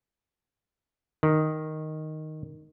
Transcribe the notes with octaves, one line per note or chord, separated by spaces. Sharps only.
D#3